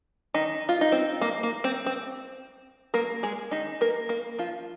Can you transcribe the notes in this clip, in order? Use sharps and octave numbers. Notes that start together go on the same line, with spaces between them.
D#3 D#4
F4
D#4
C4
A#3
A#3
C4
C4
A#3 A#4
G#3 G#4
D#3 D#4
A#3 A#4
A#3 A#4
F3 F4